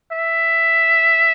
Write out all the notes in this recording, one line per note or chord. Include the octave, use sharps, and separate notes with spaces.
E5